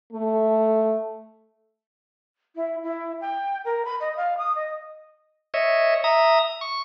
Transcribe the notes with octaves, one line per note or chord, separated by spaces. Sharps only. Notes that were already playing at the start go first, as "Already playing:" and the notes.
A3
E4
E4
G5
A#4
B5
D#5
F5
D#6
D#5
C#5 D#5 E5
E5 A#5 D#6
C#6